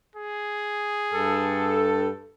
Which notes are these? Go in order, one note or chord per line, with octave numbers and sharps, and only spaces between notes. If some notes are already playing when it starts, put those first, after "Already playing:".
G#4
G2 A4